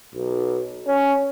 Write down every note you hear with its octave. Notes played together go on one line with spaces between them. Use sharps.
B1
C#4